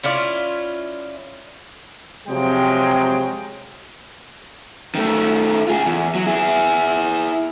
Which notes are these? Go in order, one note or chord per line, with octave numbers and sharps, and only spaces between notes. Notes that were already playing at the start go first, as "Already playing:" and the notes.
C#4 E4 F4 D5
C3 F3 F#3 G#3 G5
D#3 A3
F4 G#4
E2
F#3
E4 G#4